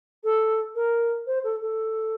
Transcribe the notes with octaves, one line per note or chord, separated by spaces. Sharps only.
A4
A#4
C5
A4
A4